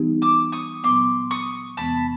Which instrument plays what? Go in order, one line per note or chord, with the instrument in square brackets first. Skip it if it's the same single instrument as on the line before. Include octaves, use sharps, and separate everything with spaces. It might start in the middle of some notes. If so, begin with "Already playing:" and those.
Already playing: [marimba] E3 G3 B3 D#4 G4
[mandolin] D6 E6
C#6 D#6
[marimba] A#2 F#3 B3 [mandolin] C6 D6
[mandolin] C#6 D#6
[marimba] E2 C3 E3 G#3 B3 [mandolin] A5 B5